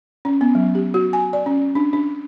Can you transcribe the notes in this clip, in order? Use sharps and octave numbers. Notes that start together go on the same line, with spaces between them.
C#4
B3
F#3
G4
F#4
G#5
D5
C#4
D4
D4